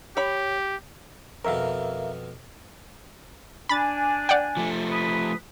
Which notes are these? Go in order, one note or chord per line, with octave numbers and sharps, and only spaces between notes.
G4 C#5 B5
F2 B2 A#4 E5 F5
D4 G#5 B5 A6
D5 F#5 G5
F3 A3
B4 D#6